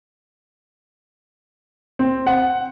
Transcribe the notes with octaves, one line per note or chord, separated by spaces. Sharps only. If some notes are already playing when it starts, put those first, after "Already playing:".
C4
F#5